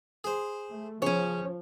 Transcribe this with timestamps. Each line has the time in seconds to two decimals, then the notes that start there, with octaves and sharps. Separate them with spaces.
0.24 G#4 C5
0.69 A3
1.02 C#3 F3 C#4 C#5